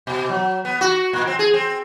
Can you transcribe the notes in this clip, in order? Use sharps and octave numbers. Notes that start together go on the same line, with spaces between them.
B2
F#3
B3
F#4
A#2
C4
G#4
C4